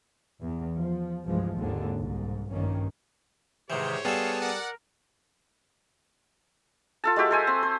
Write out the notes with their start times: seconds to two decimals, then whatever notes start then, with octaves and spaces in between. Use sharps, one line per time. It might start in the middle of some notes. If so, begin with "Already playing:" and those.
0.41 E2
0.77 F3
1.25 C2 G2 E3 F3 G#3
1.58 G#1 D#2 D3 G#3
1.98 C2 G#2
2.50 A#1 G2 D#3 A#3 C#4
3.70 G#2 C3 D#3 E3 G4 C5 C#5 G6
4.05 G3 B3 G#4 A4 F5 A5
4.41 A#4 D5 F#5
7.04 F4 A4 A5
7.16 G#3 F#4 G4 E5
7.31 A4 C5 G#5
7.47 C4
7.63 C5